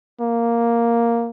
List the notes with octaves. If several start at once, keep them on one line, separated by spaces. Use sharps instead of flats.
A#3